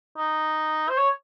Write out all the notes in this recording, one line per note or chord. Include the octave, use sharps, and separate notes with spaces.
D#4
C5
C#5